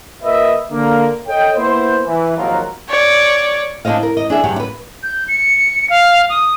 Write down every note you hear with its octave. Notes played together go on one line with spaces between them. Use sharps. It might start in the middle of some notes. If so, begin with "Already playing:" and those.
A#2 A#4 B4 D#5 E5
D3 A#3
A4 C#5 D#5 G5
A#3 B3 E4 C5
E3
G#1 D#2 F3 F#3 F4 A#4
C#5 D5
D4 E4 F#4 C5 D#5 F5
A#4
D#5
D4 G#4 E5
G2 F#3 G4 F#5
E4 B4
G6
C#7
F5
D#6